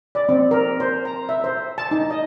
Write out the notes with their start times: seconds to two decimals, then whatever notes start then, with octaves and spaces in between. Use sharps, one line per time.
0.15 D5
0.29 C4
0.51 A#4
0.80 C5
1.05 A#5
1.29 E5
1.44 C5
1.78 A5
1.91 D#4
2.11 D#5